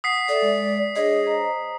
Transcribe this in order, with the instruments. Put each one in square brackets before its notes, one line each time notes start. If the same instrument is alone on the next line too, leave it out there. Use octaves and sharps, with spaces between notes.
[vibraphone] F#5 [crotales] D#6 B6 C7
[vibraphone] A4 E5 [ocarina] D5
[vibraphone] G#3
[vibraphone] D4 G#4 C#5 [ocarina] D#5
[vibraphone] C5 A#5